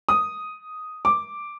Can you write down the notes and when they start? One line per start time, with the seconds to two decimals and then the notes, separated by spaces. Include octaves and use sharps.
0.09 D#6
1.05 D6